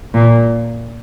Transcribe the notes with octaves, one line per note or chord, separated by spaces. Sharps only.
A#2